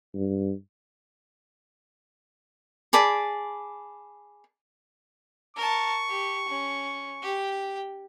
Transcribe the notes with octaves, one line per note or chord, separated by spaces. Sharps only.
G2
G#4 D5 A5 B5
A#4 A5 C#6
G4
C#4
G4 G5